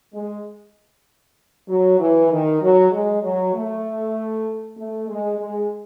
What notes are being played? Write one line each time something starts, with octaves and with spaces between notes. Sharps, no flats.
G#3
F#3
E3
D#3
F#3
G#3
F#3
A3
A3
G#3
G#3